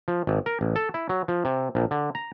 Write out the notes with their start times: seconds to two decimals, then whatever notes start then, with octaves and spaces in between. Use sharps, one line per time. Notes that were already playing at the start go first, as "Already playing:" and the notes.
0.08 F3
0.27 G#1
0.46 A#4
0.61 A1
0.76 A4
0.94 E4
1.09 F#3
1.28 F3
1.45 C3
1.75 A#1
1.91 D3
2.15 A#5